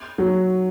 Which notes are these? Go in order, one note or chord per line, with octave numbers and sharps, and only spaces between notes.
F#3